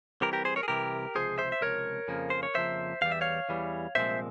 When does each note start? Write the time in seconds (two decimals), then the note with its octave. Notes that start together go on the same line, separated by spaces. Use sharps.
0.21 C2 C3 E3 G4 A#4
0.33 G4 A#4
0.45 G#4 C5
0.56 A#4 C#5
0.63 G#4
0.68 C2 C3 E3 G4 A#4
1.15 C#2 C3 F3 G#4 C5
1.38 C5 E5
1.52 E5
1.61 C#2 C3 F3 A#4 C#5
2.08 F2 C#3 F3 A#3
2.30 C5
2.43 C#5
2.55 F2 C#3 F3 A#3 C5 E5
3.01 E2 E3 G3 F5
3.12 E5
3.21 C#5 F5
3.49 E2 E3 G3
3.95 C2 A#2 F3 G#3 C4 C5 E5